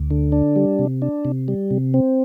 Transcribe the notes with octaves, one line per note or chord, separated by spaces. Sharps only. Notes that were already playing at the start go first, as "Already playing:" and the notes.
Already playing: D2
D3
D4
G3
C3
D4
C3
G3
C3
C4